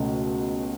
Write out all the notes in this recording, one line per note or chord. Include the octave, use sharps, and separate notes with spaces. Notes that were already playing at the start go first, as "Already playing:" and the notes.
Already playing: C#2 B2 A3 C#4